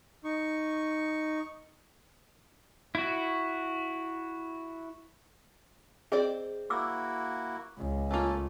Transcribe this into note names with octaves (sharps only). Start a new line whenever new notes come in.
D#4 C#6
E4 F#4
C4 G#4 C5 D5 D#5
A#3 E4 F#4 D6 E6
C#2
A3 A#3 C#4 F4 A4